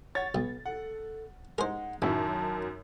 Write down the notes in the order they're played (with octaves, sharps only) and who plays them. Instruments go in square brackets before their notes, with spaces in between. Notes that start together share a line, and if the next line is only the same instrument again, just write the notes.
[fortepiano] C#5 [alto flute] F#5 [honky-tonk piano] A6
[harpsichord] B1 [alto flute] B3
[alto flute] A4 [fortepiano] F#5
[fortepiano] G#3 D#4 [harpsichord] A#4 C5 [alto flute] F#5
[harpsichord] A1 [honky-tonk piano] F#2 D#3 F#3 [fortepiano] C#4 E4 [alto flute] A5